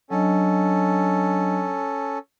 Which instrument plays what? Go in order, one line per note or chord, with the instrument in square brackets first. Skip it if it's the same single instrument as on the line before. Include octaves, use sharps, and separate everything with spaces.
[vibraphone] F#3 D4 D#5 [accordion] C#4 A4